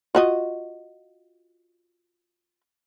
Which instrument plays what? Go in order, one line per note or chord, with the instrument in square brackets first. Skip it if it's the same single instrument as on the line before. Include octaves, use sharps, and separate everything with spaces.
[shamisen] F4 F#4 D#5